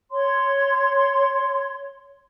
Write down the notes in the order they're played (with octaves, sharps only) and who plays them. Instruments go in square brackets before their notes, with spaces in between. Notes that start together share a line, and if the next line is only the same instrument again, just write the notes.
[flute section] C#5 C6